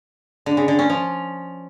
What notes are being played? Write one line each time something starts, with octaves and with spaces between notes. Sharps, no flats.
D3
C#3
D3
C#4
F3